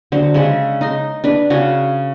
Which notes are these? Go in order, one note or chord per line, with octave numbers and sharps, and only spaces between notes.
D3 F#3 C5
C#3 G#3 E5 F#5
D#4 D#5 C6
D4 B4
C#3 F#4 G#4 F5